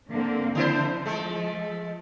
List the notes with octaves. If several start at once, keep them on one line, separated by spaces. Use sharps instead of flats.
D3 A#3 C4
C#3 F3 E4 C5
G#3 A3